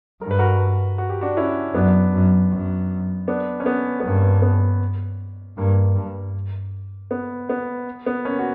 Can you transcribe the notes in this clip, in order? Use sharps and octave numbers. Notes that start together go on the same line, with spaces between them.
G2 A#4
B4
F#4 A#4
F#4
G4
D4 F#4
C#4 E4
F#2 B3 D4
F#2
F#2
B3 D4
C#4
B3
B3
G2 A#3
B3
G2 A#3
G2
B3
B3
B3
A#3 C#4
F#4